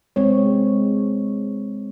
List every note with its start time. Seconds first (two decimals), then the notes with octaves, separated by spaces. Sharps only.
0.16 G#3 C4 C#5